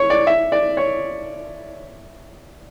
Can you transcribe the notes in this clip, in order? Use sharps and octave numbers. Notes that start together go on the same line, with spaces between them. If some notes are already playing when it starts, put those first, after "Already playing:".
Already playing: C#5
D5
E5
D5
C#5